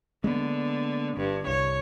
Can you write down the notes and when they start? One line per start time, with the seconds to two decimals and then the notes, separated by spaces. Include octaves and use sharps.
0.24 D3 G#3 A#3 B3
1.17 G1 G2
1.47 C2 C#5